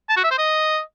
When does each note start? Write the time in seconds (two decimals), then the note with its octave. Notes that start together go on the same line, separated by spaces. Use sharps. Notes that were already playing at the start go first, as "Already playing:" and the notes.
0.09 A5
0.17 F#4
0.24 E5
0.31 C5
0.38 D#5